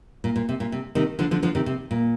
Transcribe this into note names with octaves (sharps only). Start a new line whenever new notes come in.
A#2
A#2
C3
A#2
C3
C3 D#3
D3 F3
D3 F3
D3 F3
C3 D#3
C3
A#2